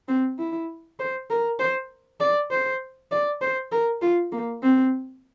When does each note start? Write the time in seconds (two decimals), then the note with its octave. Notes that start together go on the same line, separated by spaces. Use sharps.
0.08 C4
0.39 E4
0.99 C5
1.30 A#4
1.59 C5
2.20 D5
2.51 C5
3.11 D5
3.41 C5
3.72 A#4
4.02 F4
4.32 A#3
4.63 C4